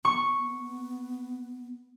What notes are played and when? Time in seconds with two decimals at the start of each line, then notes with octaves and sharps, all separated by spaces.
0.05 B3 C#6